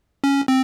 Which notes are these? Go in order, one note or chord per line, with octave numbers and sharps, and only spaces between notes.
C#4
C4